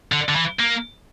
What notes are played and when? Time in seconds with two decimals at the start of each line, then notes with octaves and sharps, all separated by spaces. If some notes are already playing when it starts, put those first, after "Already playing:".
0.12 D3
0.29 D3
0.36 E3
0.59 A#3